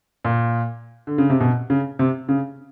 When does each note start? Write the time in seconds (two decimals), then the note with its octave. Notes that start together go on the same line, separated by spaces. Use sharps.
0.25 A#2
1.07 D3
1.18 C#3
1.30 C3
1.40 B2
1.70 C#3
1.99 C3
2.29 C#3